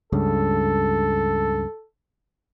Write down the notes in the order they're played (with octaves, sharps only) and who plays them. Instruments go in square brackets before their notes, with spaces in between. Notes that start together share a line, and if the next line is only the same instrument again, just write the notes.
[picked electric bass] C#2 G2 C#3 [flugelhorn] A4